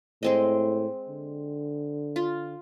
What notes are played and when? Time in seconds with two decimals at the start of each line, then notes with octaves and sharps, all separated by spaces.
0.23 A2 G#3 C4 D#5
1.09 D3
2.16 F4